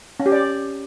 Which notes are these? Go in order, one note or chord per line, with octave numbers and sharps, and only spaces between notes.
C#4
G4
D5